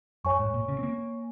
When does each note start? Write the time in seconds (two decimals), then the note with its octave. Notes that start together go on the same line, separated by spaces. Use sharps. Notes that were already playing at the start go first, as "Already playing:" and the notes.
0.25 F#2 C#5 G#5 C#6
0.39 G#2
0.54 A#2
0.68 C#3
0.79 C4
0.83 A#3